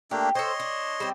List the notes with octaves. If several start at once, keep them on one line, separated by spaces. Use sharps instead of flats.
A3 A#3 D4 G4
A4 C5 C#5 D#5 C6
D4
G3 C4